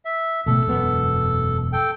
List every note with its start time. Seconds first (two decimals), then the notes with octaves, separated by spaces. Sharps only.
0.05 E5
0.46 A1 B2 A3 A4
0.67 E1 F#2 B3
1.73 A4 G5